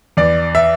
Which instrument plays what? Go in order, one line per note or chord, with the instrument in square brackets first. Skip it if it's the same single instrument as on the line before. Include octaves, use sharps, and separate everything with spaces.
[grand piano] E2 D5
E5